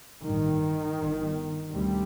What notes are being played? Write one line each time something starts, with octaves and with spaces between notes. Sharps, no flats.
A1 G2 D#3
G1 G2
D2 C3 G3